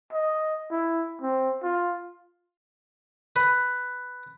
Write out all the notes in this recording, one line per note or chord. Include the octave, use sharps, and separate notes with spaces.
D#5
E4
C4
F4
B4